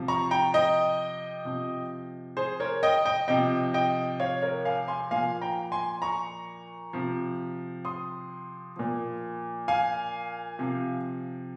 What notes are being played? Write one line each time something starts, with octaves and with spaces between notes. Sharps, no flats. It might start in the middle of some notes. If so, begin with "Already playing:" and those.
Already playing: C3 F3
A#5 C#6
G5 A#5
D#5 G5
C3 F3
G#4 C5
A#4 C#5
D#5 G5
D#5 G5
C3 F3 D#5 G5
D#5 G5
C#5 F5
A#4 C#5
F5 G#5
G#5 C6
A#2 F3 F5 G#5
G5 A#5
G#5 C6
A#5 C#6
C3 F3
C6 D#6
A#2 F3
F5 G#5
C3 F3